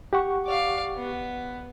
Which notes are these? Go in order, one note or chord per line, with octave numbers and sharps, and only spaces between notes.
G4 F#5 C#6
D5 F5
B3